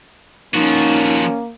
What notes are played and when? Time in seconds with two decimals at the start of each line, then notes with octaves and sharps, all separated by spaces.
0.54 F3 A#3 C#4 D#4 F#4